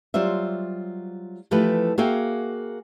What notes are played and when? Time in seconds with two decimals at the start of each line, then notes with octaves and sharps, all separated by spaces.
0.14 F#3 G3 F4 C5 E5
1.51 E3 F3 A3 G4 A4 B4
1.98 A#3 F#4 G#4 E5 F5 G5